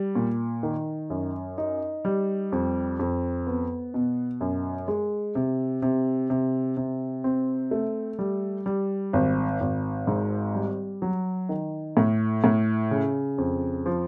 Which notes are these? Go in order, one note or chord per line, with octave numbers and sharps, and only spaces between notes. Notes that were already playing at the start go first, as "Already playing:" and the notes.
Already playing: G3
A#2
D#3
F#2
D#4
G3
F2
F2
B3
B2
F#2
G#3
C3
C3
C3
C3
C4
A3
G3
G3
G#1
G#1
G#2
G3
F#3
D#3
A2
A2
C#3
F2
F3